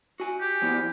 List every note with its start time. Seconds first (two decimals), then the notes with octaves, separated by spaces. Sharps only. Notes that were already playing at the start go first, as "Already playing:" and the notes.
0.20 F#4 G#5
0.41 G4
0.62 F3 B3 E4